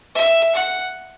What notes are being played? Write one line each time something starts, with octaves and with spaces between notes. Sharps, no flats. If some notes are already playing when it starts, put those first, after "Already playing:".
E5
F#5